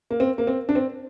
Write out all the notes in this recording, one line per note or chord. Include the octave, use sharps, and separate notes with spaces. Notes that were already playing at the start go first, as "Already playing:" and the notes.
A#3
C4
A#3
C4
D4
C4